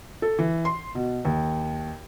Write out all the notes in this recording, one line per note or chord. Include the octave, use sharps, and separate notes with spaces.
A4
E3
C6
B2
D#2